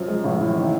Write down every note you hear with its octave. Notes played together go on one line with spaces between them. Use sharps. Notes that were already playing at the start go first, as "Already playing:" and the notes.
Already playing: F#2 F3
G#3
A1
A2
D#3